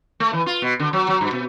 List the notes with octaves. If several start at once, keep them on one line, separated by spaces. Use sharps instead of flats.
A3
E3
F4
B2
D3
F#3
F#3
G2
B2